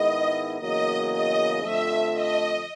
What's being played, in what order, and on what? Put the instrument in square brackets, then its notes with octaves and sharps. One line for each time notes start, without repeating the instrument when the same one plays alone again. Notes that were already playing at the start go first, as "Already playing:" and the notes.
Already playing: [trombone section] G#2 D#3 G#3 B3 E4 [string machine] D#5
[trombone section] E2 C#3 F#3 A#3 [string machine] D#5
[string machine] D#5
[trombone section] F2 D3 F3 A3 [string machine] E5
[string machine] D#5